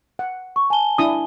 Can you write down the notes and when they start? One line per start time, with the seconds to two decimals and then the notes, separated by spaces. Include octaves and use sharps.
0.19 F#5
0.56 C#6
0.70 G#5 A5 G7
0.98 D4 E4 D#6